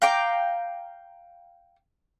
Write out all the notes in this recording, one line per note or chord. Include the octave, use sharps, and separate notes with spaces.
F5 G5 A#5 D6